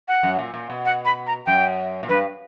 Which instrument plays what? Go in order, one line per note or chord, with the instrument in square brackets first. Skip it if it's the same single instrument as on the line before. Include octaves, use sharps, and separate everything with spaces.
[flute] F#5
[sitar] F#2
A#2
A#2
B2
[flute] F#5
B5
A#5
[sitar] F#2 [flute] G5
[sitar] A#2
[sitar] G2 [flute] B4